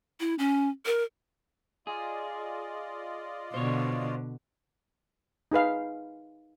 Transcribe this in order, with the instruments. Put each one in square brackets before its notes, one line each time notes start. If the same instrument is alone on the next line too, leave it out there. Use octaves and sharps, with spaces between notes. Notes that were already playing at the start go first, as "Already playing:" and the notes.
[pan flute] E4
C#4
A#4
[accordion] F4 D5 D#5 [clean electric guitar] G#4
[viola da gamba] B2 D3 [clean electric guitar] C5 C#5
[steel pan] D#4 G#4 B4 F5